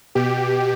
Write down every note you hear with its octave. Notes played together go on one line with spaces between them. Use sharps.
B2 G4